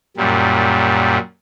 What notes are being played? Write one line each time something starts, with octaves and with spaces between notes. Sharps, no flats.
F#2 A#2 G3